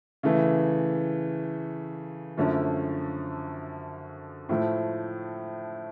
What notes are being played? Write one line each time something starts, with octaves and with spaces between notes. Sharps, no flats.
C#3 E3 A3
F#2 D3 F3 A3 C#4
A2 F3 A3